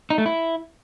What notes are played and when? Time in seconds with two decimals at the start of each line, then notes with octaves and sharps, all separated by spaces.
0.10 D#4
0.18 A3
0.26 E4